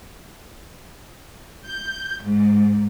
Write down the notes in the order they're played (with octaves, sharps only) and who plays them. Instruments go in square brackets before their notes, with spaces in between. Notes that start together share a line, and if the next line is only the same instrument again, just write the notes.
[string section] G6
G#2